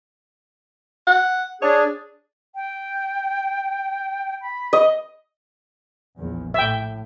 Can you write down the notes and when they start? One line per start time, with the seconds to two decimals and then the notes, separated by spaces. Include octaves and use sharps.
1.07 F#5
1.62 D4 G#4 C#5
2.55 G5
4.41 B5
4.73 D#5
6.18 A#1 E2
6.54 A2 E5 G5